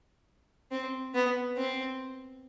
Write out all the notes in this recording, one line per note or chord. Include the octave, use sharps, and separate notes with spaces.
C4
B3
C4